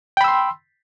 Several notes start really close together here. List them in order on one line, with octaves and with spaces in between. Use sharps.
G5 B5 E6 C6